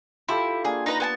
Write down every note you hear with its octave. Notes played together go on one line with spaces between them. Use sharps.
E4 F4 G4 A4
A#3 D4 G#4
D#4 B4 A#5
B3 G#5 A5